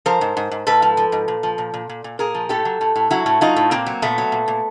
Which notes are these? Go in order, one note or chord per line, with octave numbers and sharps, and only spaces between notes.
F3 A#4 C5
G#2
G#2
G#2
G#2 A4 B4
F3
F3
G#2
A#2
F3
A#2
A#2
A#2
A#2
A#2 G#4 A#4
F3
A2 G4 A4
F#3
A2
A2
F#3 E4 F#4
A2
F#3 D#4 F4
A2
A#2 A#3 C4
F#3
A#2 A3 B3
F#3
A#2
A#2